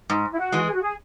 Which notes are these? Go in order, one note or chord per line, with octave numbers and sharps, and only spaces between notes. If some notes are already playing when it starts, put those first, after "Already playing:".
G#2
E4
F#4
E3 G#3
G#4
F#4
G#4